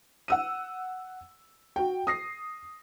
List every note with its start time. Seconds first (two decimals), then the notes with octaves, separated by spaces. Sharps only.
0.28 F#5 E6 D#7
1.76 F#4 G5
2.07 D#6 A#6 C7